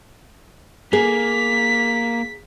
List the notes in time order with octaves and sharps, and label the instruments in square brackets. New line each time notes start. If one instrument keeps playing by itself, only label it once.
[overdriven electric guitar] A#3 [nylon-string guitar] G#4 [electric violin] B6